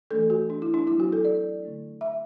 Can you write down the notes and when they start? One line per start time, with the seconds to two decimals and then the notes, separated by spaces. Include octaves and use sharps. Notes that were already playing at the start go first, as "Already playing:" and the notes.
0.11 E3 A3 D4 A4
0.30 F#4
0.50 D4
0.62 E4
0.74 D4
0.87 F#3 B3 D4 E4
1.00 F#4
1.12 A4
1.25 D5
1.63 D3 A3 D4
2.01 E5